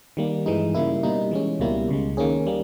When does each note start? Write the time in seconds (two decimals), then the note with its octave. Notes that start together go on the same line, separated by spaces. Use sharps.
0.17 D#3 G3 A#3
0.46 G2 E3 G#3 D#4
0.74 C#3 G3 A#3 E4
1.03 B2 G3 A#3 D#4
1.31 E3 G#3 C#4
1.60 C#2 B2 G3 A#3 E4
1.88 C#2 C#3 G#3
2.17 D#3 A#3 C#4 G#4
2.47 G3 A#3